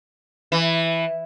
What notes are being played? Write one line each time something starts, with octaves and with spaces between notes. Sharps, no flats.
E3